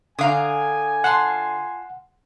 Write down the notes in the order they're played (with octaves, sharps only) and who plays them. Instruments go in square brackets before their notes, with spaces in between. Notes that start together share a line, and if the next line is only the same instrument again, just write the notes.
[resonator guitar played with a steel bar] D3 F5 [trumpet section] G#5 [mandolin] A#5 D#6
[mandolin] F4 A5 C6 [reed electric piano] F#5